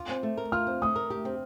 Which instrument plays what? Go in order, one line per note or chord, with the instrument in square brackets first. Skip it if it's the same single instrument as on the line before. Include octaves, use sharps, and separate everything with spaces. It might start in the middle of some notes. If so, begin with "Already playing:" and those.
Already playing: [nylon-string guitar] F4 [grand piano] D6
[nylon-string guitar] C4
A3
A#4
[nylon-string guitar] F4 [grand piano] F6
[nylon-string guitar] C4
[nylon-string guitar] A3 [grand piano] D#6
[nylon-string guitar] A#4
G4
C4